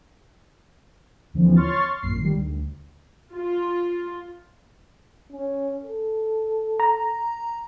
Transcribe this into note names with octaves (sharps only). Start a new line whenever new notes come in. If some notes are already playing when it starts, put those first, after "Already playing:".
D#2 D3 E3 F3 C4
C#5 C6 C#6 F6 A6
G#1 F#2 A#2 C7
D#3 G3
D2
F4
C#4
A4
A#5